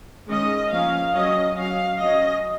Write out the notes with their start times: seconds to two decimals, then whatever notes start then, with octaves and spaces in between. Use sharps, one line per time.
0.28 D#3 G#3 C#4 D#5
0.72 F3 A#3 C#4 F5
1.14 F#3 C#4 D#5
1.57 F#3 C#4 F5
2.00 F#3 C#4 D#5